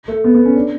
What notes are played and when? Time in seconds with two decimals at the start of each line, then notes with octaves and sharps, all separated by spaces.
0.08 A3
0.24 B3
0.35 B3
0.45 C#4
0.56 D4